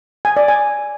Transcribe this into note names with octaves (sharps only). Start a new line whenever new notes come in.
G#5
D5
G#5